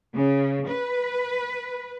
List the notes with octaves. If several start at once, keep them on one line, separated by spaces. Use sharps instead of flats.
C#3
B4